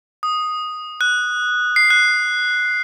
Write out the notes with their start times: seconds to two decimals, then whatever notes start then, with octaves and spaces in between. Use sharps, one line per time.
0.23 D#6
1.01 F#6
1.76 C7
1.90 F#6